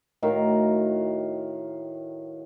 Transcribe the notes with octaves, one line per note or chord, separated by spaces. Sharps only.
A2 D#3 F#4 F5